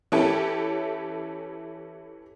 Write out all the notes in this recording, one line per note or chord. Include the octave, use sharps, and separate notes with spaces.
E3 C#4 E4 G4 A4